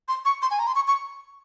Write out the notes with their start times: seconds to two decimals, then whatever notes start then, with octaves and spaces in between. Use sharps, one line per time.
0.08 C6
0.25 C#6
0.42 C6
0.51 G#5
0.59 A#5
0.67 C6
0.75 C#6
0.88 C#6